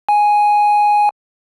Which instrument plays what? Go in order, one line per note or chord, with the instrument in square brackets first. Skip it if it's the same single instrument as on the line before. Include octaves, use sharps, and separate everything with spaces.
[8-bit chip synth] G#5